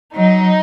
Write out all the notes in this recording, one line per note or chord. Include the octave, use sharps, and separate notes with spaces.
F#3 D#4